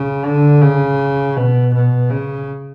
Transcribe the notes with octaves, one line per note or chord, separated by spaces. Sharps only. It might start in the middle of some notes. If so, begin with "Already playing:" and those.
Already playing: C#3
D3
C#3
B2
B2
C#3